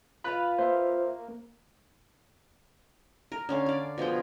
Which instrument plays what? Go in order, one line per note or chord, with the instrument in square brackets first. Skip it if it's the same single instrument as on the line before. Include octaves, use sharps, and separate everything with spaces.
[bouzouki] F4 B4 F5 [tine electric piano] B5 F#6
[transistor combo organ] A#3 [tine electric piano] C5 E5
[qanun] A#4
D3 C#4 F5
D5 F5
B2 F3 G#4 G5